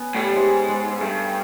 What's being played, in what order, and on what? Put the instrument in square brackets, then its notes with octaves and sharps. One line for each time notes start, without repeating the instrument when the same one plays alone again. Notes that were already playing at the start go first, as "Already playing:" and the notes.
Already playing: [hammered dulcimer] B3 C#4
[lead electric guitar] A2 [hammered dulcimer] G3
[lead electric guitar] G#2 [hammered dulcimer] G3 G#3
[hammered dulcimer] G#3
[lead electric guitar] G2 [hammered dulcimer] A3